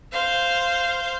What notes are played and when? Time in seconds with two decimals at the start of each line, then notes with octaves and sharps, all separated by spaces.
0.13 C5 F5